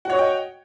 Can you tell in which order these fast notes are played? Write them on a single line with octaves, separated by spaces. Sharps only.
F#4 C#5 D#5 G5